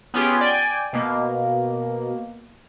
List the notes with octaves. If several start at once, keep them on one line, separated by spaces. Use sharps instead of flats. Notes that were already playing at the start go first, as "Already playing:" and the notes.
B3 C#4 F4 G4 G#4
D5 G5 G#5
B2 A#3